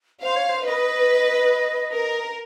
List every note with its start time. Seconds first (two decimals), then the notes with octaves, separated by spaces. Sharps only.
0.22 C5 F5
0.36 C#5
0.49 C5
0.65 B4 D#5
1.94 A#4